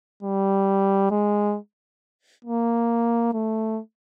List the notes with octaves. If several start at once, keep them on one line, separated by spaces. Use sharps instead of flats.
G3
G#3
A#3
A3